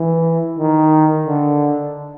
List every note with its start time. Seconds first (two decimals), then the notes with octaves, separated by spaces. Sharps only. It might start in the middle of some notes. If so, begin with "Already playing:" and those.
Already playing: E3
0.58 D#3
1.26 D3